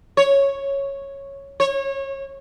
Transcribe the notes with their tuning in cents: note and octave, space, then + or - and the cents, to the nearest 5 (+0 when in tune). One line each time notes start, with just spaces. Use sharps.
C#5 -5
C#5 -25